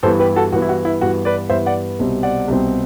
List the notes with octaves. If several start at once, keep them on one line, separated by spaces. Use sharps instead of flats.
G2 E3 B3 A4 C5
G4 B4
F#4 A4
G2 E3 B3 F#4
E4
F#4
E4
G2 E3 B3 F#4
B4 D5
G2 E3 B3 C5 E5
D5 F#5
C2 B2 G3 C4
D5 F#5
C2 B2 G3 C4